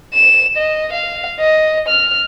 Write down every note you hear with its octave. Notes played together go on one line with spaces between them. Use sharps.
E7
D#5
F5
D#5
F6